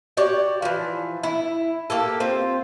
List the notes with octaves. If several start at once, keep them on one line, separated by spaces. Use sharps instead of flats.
F#4 G4 C#5 D5
E3 F3
E4
A#3 G4 A4
C4 F4